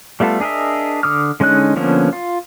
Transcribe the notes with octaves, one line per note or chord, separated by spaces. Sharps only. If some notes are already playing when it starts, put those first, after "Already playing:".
G3 A3 B3 F4 A4
D4 G#4 A#4 D#5 E5
D3 D6 D#6 F6
D3 G#3 C#4 D#4 F#6
D3 F3 A#3 B3 C#4
F4